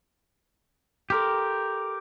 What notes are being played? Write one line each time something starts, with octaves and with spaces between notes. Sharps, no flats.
G4 A4 A#4 C6 D6